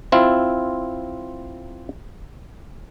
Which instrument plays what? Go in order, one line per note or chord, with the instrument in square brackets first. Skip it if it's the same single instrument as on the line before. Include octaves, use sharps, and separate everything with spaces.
[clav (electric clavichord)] C4 E4 F4